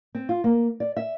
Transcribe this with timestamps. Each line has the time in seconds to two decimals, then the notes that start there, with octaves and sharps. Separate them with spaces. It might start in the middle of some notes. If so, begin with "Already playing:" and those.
0.15 C4
0.29 F4
0.44 A#3
0.80 D5
0.97 E5